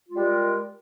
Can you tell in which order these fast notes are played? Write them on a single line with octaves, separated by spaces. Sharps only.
F4 G#3 G3 A#4